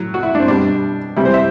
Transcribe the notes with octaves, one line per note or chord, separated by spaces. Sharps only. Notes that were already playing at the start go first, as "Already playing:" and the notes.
Already playing: A2 F#3
F#4
E4
D4
C4
B2 G3 D4
C3 E3 G3 E4
C5
E5